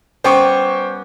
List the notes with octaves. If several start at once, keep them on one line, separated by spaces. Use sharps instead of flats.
G3 B3 C#4 C5 G5 C#6